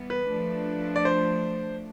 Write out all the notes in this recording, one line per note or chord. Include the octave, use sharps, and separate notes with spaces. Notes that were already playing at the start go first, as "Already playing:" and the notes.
Already playing: E3 G3 B3
B4
F3 A3 D4
D5
C5